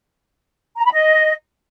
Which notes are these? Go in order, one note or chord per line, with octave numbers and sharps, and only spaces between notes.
A#5
B5
D#5